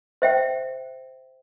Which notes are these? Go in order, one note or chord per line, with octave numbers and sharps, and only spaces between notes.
C5 E5 G5